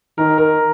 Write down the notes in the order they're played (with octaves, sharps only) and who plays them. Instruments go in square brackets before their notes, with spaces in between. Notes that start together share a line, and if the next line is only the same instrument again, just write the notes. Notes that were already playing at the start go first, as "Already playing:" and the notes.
[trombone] D#3 [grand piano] A#4
[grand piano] A#4